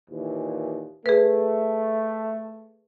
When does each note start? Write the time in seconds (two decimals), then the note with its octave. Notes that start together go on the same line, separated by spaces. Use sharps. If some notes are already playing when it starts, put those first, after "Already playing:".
0.10 D#2 A#2 E3
1.06 A3 G#4 B4